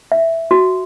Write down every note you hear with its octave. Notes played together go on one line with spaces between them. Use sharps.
E5
F#4